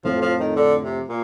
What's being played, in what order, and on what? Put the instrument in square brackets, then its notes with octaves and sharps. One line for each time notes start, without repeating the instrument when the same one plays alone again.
[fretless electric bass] F2 A2 [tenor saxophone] F3
[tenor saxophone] F3
D#3
D3
C3
A#2